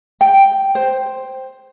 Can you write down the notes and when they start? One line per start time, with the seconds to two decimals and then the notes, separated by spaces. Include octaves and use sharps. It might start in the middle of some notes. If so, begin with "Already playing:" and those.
0.21 G5
0.75 C5